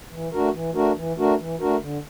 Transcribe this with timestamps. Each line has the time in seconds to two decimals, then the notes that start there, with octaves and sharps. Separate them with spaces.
0.11 E3
0.32 A3 D4 F#4 A#4
0.54 E3
0.74 A3 D4 F#4 A#4
0.96 E3
1.18 A3 D4 F#4 A#4
1.39 E3
1.60 A3 D4 F#4 A#4
1.81 D3